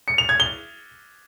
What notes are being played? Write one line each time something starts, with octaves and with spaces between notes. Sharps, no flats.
C#7
F7
G#6
G7